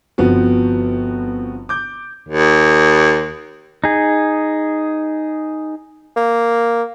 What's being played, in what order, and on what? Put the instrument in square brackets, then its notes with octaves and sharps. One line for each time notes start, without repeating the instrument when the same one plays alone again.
[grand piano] G1 F3 B3 C4 F#4
D6 G6
[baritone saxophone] D#2
[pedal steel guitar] D#4 G#4
[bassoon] A#3